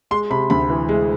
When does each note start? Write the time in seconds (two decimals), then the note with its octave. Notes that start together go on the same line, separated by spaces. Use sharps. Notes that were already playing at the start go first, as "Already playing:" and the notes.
0.11 G#3 C6
0.30 C3 B5
0.50 D2 B5
0.70 E3
0.89 G#3